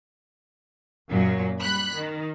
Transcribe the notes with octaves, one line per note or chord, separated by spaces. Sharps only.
F#2 A#2 F#3
G3 B5 F#6
D#3